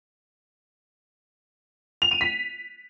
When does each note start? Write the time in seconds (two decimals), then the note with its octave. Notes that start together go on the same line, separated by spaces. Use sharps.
2.02 F7
2.11 D#7
2.21 B6